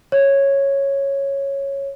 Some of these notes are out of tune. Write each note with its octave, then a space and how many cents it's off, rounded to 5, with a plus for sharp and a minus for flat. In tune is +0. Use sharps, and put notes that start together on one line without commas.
C#5 -5